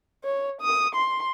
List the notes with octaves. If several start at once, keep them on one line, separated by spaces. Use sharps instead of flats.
C#5
D#6
C6